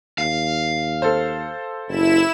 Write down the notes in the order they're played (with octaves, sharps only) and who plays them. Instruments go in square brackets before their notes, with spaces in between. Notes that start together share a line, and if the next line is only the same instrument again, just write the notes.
[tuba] D#2 [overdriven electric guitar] F5
[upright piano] A4 C5
[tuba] F#1 [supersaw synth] E4 E7